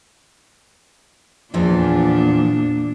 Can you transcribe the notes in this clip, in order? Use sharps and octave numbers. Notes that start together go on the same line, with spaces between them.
E2 A#2 E3 F3 D4